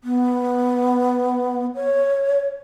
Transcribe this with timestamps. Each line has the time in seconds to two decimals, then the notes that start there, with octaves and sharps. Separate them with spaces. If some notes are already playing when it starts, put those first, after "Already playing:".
0.04 B3
1.75 C#5